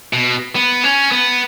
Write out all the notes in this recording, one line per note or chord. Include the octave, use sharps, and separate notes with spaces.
B2
B3
C#4
B3